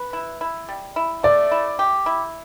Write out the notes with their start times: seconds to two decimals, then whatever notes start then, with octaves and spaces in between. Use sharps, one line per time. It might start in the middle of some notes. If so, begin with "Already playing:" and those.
Already playing: B4
0.13 E4
0.41 E4
0.69 G3
0.96 E4
1.23 A3 D5
1.51 E4
1.79 G4
2.06 E4